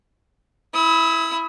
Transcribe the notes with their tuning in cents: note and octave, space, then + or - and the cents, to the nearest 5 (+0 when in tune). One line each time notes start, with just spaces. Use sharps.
E4 +0 D#6 +45